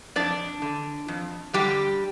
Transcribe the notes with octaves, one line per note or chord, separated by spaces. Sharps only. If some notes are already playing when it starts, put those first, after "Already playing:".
F2 D4 D5
D3
F2
D3 G3 G4